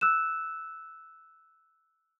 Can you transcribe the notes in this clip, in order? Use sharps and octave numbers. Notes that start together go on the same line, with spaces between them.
E6 F#6 E7